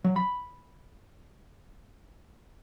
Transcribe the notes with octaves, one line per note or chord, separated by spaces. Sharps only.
F#3
B5